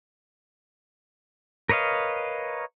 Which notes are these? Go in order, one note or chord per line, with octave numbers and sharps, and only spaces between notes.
A#4 B4 C#5 D#5 F5